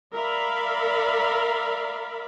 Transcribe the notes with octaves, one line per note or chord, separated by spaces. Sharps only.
A#4 D5 E5 F5 B5